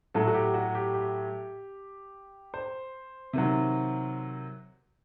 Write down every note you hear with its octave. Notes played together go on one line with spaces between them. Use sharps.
A2 F#3 A4
F#4
G4
F#4
G4
G4
C5
C3 D#3 F#3